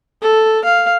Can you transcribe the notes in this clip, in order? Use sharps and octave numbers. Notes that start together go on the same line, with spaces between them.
A4
F5